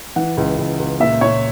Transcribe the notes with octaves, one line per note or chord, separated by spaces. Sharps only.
E3 F#5
C#2
C#2
C#2
A#2 E5
A#2 C#5